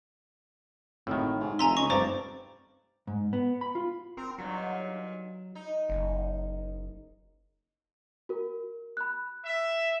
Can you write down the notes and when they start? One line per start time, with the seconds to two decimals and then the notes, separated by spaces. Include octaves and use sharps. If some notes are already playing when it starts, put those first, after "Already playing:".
1.07 G#1 A2 D#3
1.40 G#2
1.59 F1 E5 G#5 A#5 C6
1.77 C#2 D#5 C#6
1.90 F1 G2 C5 D5 A5 A#5
3.07 G#2
3.33 B3
3.61 B5
3.75 F4
4.17 C4 A#4
4.38 G2 A#2 D#3 F#3
5.55 D#4
5.89 F#1
8.29 F#4 A#4
8.97 B5 F#6
9.45 E5